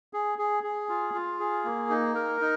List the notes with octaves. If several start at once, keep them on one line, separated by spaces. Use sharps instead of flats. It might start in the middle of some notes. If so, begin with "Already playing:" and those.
G#4
G#4
G#4
F4
F4
G#4
A#3
D#4
A#4
D#4